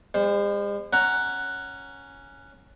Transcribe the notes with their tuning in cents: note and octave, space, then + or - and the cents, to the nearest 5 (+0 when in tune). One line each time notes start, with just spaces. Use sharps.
G#3 -45 C5 +0
C#4 +0 F#5 +5 A#5 +5